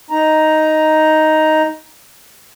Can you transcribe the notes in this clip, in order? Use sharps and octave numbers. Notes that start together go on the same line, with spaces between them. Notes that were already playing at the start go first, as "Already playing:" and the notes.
D#4 A#5